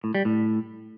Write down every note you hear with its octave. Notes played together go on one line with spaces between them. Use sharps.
A2
G3
A2